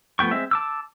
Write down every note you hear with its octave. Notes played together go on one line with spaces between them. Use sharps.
F3 A3 B3 G5 C#6
G#3 C4 E5
A5 D6 E6